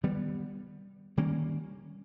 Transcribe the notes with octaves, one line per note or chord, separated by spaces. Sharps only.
D#3 G3 B3
D#3 G3 A#3 C#4